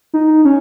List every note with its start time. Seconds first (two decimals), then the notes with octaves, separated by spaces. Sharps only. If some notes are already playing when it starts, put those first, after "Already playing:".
0.14 D#4
0.45 C#4